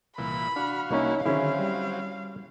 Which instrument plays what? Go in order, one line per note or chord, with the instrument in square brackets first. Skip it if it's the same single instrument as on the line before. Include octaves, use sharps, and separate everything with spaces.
[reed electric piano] C2 [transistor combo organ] A#2 E3 [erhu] B5
[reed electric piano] D4 [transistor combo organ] F#4 F5
[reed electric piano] C2 A#3 C#6 [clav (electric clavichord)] C#4 D#4 C#5 [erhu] E4
[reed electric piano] D3 D#3 G#4 [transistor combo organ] F#3 C4 [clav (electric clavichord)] C#4 E4 [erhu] F5
[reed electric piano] G3